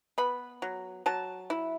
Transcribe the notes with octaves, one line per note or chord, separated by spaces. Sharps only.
B3 B5
F#3
F#3 A5
E4